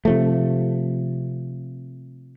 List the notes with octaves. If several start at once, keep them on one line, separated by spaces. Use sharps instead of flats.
C3 F3 A3